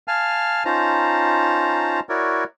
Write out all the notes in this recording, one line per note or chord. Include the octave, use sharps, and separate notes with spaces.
F5 G#5 A5 F6
C#4 D#4 F4 C5 A5 A#5
E4 F#4 A#4 C#5 D5